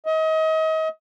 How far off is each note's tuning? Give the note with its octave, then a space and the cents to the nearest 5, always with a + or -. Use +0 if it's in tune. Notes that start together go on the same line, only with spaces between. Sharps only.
D#5 +35